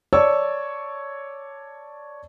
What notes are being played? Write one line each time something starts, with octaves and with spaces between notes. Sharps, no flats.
C#5 D5 A5 C#6 E6